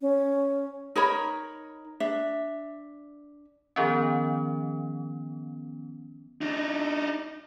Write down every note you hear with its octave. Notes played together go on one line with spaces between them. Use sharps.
C#4
D#4 A#4 C#5 B5
D4 E5
D#3 F3 B3 C#4
D4 D#4